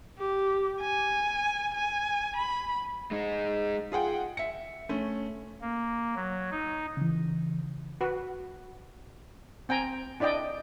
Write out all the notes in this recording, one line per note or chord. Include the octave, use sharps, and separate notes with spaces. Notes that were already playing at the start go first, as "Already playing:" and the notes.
G4
G#5
G#5
B5
G#3 D#4
F4 G#4 F#5 G5
E5 C#7
A3 C#4
A#3
F#3
D#4
C#3 E3
F#4 B4
C4 G5 G#5 A#5
D4 E4 D5 D#5 G5